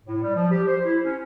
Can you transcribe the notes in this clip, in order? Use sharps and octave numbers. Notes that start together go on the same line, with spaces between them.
A2
G3
F3
G4
C5
E4
C#4